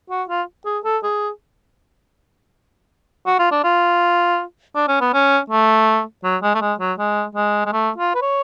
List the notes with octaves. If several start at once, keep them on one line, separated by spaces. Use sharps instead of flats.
F#4
F4
G#4
A4
G#4
F#4
F4
D4
F4
D4
C#4
B3
C#4
A3
F#3
G#3
A3
G#3
F#3
G#3
G#3
G#3
A3
F4
B4
C#5